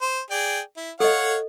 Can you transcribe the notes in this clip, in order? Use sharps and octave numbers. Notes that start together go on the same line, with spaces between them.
C5
G#4 D5 G5
E4
A4 C#5 D#5 F5 F#5